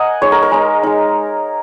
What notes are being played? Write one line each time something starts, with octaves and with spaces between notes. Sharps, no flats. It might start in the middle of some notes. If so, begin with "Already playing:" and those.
Already playing: A#4 D#5 F#5 G#5
G#3 D#4 C#5
A#4
A#4
G#3 D#4
G#3 D#4